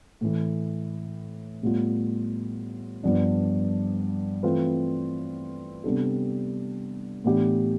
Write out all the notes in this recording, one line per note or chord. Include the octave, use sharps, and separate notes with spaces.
A2 E3 A3
A2 G3 B3 F4
G2 F3 B3 D4
E3 A3 C4 F4 B4
C3 G3 B3 D4 A4
A2 E3 B3 D4 G4